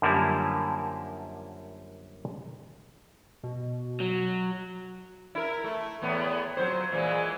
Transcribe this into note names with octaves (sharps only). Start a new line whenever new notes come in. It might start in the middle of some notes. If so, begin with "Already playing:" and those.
F#2 D3 F3 G3 A#3 E4
B2
F#3
E4 A#4
A3
E2 A2 B3
F2 F#3 C5
A#2 E3 G#3